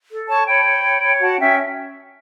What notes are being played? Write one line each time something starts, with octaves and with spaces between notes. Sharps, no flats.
A4
C#5 A5 C#6
C#5 G5 B5
C#5
C#5
C#5
F#4 F#5 A5
C#4 E5 G5